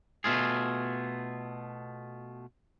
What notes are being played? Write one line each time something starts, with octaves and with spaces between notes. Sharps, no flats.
B2 A3 F4 G#4